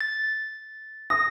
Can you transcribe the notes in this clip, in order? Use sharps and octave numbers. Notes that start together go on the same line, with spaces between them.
A6
D#6 A#6